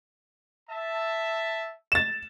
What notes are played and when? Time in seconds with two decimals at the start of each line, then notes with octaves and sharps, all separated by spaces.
0.69 E5 A5
1.92 A6 E7